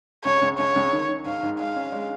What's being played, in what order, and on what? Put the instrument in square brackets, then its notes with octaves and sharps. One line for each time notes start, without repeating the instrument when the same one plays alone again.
[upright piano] C#2 [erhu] C#5
[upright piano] C#2
[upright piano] C#2 [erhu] C#5
[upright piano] C#2
D#3
D#3
[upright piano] G#2 [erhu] F5
[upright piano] G#2
[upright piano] G#3 [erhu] F5
[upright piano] C#4
G#3